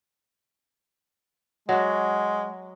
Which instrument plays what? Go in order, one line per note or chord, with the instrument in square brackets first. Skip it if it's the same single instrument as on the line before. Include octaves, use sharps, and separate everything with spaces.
[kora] F#3 F#4 [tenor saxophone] G#3